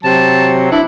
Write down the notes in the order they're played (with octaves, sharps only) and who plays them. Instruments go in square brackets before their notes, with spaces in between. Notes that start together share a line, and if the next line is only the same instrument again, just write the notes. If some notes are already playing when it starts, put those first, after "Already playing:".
[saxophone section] C3 F#3 [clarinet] A5
[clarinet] D4 [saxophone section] E4